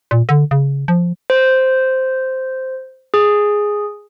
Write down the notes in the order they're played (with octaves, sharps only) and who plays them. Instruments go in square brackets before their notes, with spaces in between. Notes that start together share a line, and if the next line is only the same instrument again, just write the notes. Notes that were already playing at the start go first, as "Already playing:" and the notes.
[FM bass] A#2
D3
C#3
F3
[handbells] C5
G#4